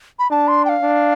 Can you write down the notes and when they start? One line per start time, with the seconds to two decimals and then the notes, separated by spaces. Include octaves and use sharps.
0.19 B5
0.31 D4 A5
0.48 C6
0.65 G5
0.69 F5
0.82 D4